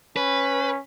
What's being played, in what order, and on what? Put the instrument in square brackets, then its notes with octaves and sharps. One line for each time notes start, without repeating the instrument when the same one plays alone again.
[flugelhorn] C#4 [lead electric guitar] B4